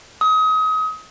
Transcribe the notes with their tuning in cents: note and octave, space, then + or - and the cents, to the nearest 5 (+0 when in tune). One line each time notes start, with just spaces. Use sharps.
D#6 +30